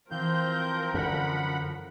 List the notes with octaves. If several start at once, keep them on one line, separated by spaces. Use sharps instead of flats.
E3 F3 C4 A#4 F5 G6
F#2 D3 F#5 B5